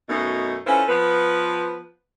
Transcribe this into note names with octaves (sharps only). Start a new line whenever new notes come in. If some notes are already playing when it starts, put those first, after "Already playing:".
F#2 B2 A3 D#4
C#4 E4 F4 A4 B4 C5
F3 B3 B4